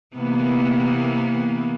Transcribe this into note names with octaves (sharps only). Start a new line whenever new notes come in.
C3 E3 A#3 B3